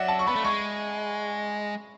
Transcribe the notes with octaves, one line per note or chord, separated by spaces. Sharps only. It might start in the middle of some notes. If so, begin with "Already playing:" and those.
Already playing: F#3 D5 E5 F#5
A5
C#6
B3 B5
A3
G#3 C#6